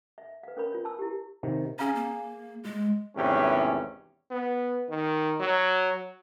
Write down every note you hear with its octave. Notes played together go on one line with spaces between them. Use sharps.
E5
B4 F5
C#4 A#4 C#5 B5
F4 C#5
A5 E6
E4 G4
C3 D#3
C#4 G#4 F5 A#5
A#3
G#3
G#1 E2 C3 A3 C#4 G4
B3
D#3
F#3